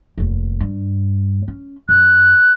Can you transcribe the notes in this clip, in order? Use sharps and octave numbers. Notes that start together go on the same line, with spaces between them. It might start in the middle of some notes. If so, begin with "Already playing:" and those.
F1 D#2
G2
C#4
F#2 F#6